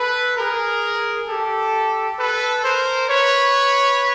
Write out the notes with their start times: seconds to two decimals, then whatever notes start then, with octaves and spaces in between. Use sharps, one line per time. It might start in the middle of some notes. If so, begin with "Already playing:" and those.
Already playing: A4 B4
0.37 G#4 A#4
1.28 G4 A4
2.18 A4 B4
2.63 A#4 C5
3.09 B4 C#5